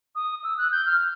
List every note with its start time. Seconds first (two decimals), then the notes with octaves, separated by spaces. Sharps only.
0.15 D#6
0.44 E6
0.58 F#6
0.72 G6
0.86 F6